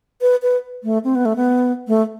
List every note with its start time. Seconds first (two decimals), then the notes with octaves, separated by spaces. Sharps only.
0.21 B4
0.42 B4
0.84 A3
1.04 C4
1.15 B3
1.25 A3
1.36 B3
1.88 A3